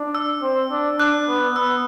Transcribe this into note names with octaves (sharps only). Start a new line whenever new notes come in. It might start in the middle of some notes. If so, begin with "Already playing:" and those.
Already playing: D4
E6
C4
D4
D4 F#6
B3
B3 E6